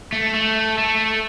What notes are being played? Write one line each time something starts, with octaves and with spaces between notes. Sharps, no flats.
A3
A3
A3